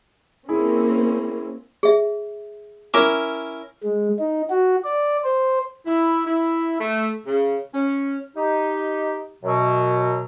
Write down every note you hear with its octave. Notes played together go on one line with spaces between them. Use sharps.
A#3 C4 C#4 E4 G#4
G#4 E5
C#4 E4 A#4 D6
G#3
D#4
F#4
D5
C5
E4
E4
A3
C#3
C#4
D#4 G4
F#2 B2 F#3